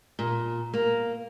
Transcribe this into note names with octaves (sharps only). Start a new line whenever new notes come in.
A#2
A#3